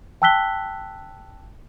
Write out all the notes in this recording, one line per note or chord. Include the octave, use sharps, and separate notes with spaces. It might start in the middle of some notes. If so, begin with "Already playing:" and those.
G5 A5 E6 F#6 B6 G7